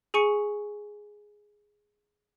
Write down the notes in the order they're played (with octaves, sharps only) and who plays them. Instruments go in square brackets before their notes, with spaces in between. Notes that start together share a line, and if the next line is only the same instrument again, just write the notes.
[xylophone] G#4 G#5 C#6 C#7